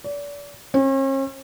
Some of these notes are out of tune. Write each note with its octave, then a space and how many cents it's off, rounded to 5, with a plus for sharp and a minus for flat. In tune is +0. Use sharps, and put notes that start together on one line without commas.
D5 -35
C#4 -45